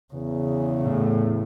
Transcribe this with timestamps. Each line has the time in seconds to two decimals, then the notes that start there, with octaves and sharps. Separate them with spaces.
0.14 E2 C#3
0.83 A2